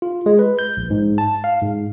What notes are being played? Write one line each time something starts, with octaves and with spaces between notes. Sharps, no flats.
F4
G#3
B4
G6
A#1
G#2
A5
F5
G#2